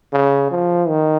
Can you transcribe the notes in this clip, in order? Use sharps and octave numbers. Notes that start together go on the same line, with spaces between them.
C#3
F3
D#3